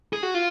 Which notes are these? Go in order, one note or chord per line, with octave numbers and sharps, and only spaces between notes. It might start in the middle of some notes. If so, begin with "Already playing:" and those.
G#4
F#4
F4